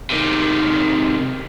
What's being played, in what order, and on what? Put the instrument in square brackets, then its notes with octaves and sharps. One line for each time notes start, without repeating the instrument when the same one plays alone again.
[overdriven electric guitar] C3 D#3